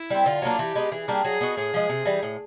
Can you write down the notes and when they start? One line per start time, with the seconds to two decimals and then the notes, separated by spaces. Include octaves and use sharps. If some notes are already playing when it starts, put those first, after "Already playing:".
Already playing: E4
0.10 G3 C4
0.26 D3 F4
0.42 F#3 A#3 D4
0.59 E3 G4
0.75 G#3 B3 D#4
0.92 E3 G#4
1.08 G3 A#3 D4
1.24 F#3 G#4
1.41 B3 D#4 F#4
1.56 A2 G#4
1.74 F3 G#3
1.89 C3
2.05 E3 G3
2.23 A2